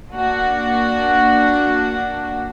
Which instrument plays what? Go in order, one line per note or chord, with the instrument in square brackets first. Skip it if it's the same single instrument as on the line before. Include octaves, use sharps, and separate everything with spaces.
[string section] A#3 D4 F#4